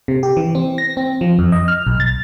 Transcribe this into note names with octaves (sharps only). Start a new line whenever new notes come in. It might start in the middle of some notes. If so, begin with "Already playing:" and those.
C3
G4
E3
C4
A#6
C4
F3
F2
D#5
F6
B1
A6